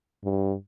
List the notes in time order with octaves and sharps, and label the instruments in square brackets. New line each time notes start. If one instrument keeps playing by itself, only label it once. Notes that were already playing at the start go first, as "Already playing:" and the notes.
[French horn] G2